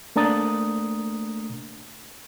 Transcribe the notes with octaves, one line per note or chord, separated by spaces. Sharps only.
A3 A#3 D4 A#5 D#6 A6